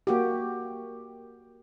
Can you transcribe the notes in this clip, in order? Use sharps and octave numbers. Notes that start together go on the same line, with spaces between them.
A#3 F#4 G4